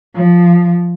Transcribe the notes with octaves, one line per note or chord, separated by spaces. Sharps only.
F3